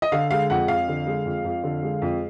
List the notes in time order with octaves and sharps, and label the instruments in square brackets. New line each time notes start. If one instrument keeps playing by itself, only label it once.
[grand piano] D#5
D3 F5
G#3 F5
F2 F#5
F2 F5
D3
G#3
F2
F2
D3
G#3
F2